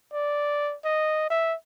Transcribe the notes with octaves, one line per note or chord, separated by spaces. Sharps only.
D5
D#5
E5